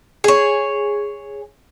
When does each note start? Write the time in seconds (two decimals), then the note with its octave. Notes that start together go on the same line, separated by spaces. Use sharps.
0.24 G#4 C#5